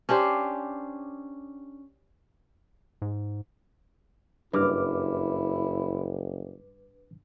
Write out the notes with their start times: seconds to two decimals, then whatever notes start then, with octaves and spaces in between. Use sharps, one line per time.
0.09 C#4 D4 G4 C5
3.02 G#2
4.53 F#1 G2 E4 B4 D6 F6